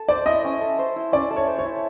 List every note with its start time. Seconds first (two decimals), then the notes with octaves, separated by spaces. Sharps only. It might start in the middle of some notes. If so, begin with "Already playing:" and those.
Already playing: A4
0.09 C5 D5
0.26 E4 D#5
0.44 C#4
0.61 A4
0.79 C5
0.96 E4
1.12 C#4 D5
1.30 A4
1.36 C#5
1.47 C5
1.59 C#5
1.65 E4